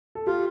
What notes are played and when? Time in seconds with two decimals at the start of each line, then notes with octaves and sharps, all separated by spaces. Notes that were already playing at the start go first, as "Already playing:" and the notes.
0.15 A4
0.27 F4 G4